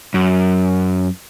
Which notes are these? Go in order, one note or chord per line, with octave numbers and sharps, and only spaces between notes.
F#2